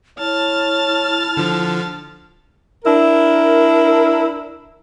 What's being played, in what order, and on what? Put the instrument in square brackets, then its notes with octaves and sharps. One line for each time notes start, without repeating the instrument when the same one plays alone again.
[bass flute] E4 [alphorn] C#5 [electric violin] A5 F6
[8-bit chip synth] D3 F3
[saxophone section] D4 E4 A#4